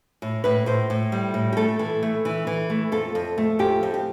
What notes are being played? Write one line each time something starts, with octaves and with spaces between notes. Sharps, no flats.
A2
A2 B4
A2 C5
A2
G3
A2
G4
A3 A4
E3
A3
E3
E3
A3
F2 A4
F2
A3
F2 G4
F2
G4